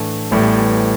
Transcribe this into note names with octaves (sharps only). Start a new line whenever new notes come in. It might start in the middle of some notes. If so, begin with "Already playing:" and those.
Already playing: A2 E3 A3 D4
A1 A2 E3 G3 B3